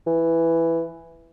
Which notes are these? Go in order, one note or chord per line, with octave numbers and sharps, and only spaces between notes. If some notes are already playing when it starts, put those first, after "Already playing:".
E3